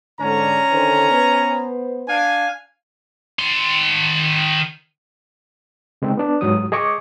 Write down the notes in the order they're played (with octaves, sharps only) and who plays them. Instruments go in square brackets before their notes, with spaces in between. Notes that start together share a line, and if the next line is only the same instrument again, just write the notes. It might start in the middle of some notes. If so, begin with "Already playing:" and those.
[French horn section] G#2 D3 [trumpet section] C#4 G#5 A#5
[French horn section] D3 D#3 C5
B3 C5
[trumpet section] D4 F5 G#5
[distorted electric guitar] D#3 C6
[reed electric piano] C#3 G#3 C4 D#4
B3 D4
G#2 F#3 D#6
G#4 D#5 G#5 C#6 D6